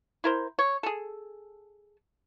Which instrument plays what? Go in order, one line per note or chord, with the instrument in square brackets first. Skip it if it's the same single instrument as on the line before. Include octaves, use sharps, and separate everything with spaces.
[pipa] E4 A#4 C5
C#5
G#4 A4